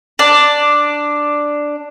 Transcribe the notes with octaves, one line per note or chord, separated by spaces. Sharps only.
D4 D5